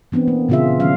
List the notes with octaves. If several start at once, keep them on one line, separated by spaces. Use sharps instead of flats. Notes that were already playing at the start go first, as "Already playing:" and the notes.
E3 B3 C4 D4
A#3
A#2 C#3 C4 F4 G#4 E5
D#3 F#3 C#4 F5